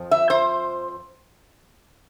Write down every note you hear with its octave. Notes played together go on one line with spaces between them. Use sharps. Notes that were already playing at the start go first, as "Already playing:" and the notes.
Already playing: F2 F3
E5
C5